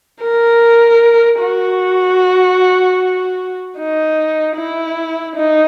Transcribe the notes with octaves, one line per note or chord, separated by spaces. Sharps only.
A#4
F#4
D#4
E4
D#4